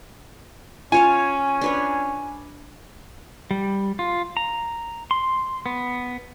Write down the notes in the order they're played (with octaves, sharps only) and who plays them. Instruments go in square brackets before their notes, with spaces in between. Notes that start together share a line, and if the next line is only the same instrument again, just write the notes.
[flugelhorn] C#4 [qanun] F4 C#5 F5 [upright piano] G#5
[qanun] D4 B4 C#5
[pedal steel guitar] G3
F4
A#5
C6
B3